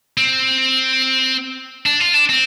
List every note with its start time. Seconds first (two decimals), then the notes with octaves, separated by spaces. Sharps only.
0.17 C4
1.86 D4
2.00 F4
2.14 D4
2.29 C4